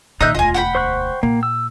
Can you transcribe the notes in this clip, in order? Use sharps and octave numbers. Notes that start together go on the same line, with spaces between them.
A#2 D#3 D#4 D#5 E5 F#6 G6
E1 D2 F4 D#5 G#5
F#5 G5 B5
C5 C#6 F#6
A#2 A#3
E6